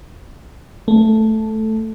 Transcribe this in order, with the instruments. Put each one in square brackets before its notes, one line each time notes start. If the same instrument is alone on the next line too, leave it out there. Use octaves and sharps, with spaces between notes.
[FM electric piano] A3